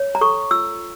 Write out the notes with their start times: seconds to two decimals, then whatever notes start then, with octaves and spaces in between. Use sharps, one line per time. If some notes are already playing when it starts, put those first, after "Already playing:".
Already playing: C#5
0.15 A#5
0.21 A4 C#6
0.51 F4 E6